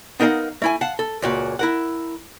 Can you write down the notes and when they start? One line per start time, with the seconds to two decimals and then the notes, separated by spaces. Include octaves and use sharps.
0.20 B3 D#4 A#4 D#5 F5 F#5
0.62 A3 E4 G#5
0.81 F5 F#5 A5
0.99 A4
1.22 C#2 A#2 F#4
1.59 E4 A#4 F#5